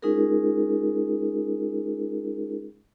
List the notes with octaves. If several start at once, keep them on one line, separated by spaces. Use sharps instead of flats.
G#3 C#4 D#4 F4 G#4 A#4